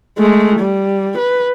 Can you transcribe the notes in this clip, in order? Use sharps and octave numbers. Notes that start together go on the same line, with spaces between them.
G#3 A3
G3
B4